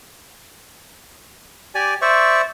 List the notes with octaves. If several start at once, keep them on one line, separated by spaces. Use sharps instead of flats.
G4 D5 G#5
C5 D5 E5 C#6